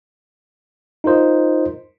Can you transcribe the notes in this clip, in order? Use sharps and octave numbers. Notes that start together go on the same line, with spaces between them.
D#4 F4 A#4 C5 D#5